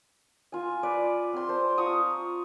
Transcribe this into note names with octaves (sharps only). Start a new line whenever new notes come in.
F4 G#5
B4 D5
C4 C6
C5 A5
F4 A#5 C#6 D#6